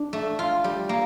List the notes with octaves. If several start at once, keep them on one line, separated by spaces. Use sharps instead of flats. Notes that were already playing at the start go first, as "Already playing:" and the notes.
Already playing: D4
A3
F4
G3
A#3